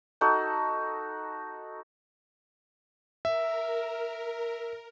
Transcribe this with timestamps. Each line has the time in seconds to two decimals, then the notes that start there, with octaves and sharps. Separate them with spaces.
0.21 D#4 F#4 A4
3.25 A#4 E5